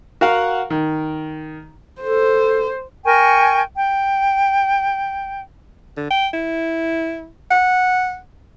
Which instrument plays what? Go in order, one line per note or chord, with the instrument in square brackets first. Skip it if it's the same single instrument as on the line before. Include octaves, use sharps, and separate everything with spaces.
[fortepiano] F#4 A#4 F5 F#5
D#3
[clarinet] A4 [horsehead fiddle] C5
[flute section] A#4 G5 G#5 C#6
G5
[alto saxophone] D3
G5
E4
F#5